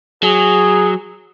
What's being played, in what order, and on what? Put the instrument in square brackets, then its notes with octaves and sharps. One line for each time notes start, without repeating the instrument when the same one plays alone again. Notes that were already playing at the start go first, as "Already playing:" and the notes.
[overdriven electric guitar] F#3 [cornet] G#4